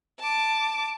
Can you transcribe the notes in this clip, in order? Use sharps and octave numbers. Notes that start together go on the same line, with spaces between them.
A5 D6